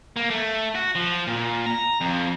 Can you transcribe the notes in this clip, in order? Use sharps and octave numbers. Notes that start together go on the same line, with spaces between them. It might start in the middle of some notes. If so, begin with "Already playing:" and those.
A#3
A3
F#4
F3
A#2
A#5
F2